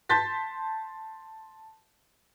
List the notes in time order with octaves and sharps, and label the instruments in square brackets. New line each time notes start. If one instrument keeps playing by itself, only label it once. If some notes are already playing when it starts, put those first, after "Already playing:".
[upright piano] A5 C6 G6 A6 B6